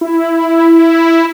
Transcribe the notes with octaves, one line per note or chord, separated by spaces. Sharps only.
E4